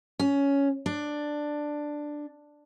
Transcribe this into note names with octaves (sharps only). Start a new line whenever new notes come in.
C#4
D4